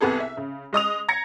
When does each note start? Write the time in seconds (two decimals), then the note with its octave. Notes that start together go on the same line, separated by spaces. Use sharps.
0.01 C2 C3 B3 G#4 A4
0.20 E5
0.37 C#3
0.73 G#3 D#5 D#6 F7
1.08 A#5 G#6 A#6 C#7